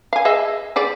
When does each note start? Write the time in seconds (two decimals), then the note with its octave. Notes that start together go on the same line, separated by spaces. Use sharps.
0.13 F5 G#5
0.25 G#4 D#5 E5
0.76 G4 G#4 D5